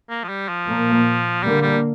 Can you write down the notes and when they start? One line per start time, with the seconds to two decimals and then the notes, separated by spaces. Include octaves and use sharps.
0.09 A#3
0.23 F3
0.29 G3
0.48 F3
0.68 A#2 A#3
1.43 D3 G3 A#3
1.62 G3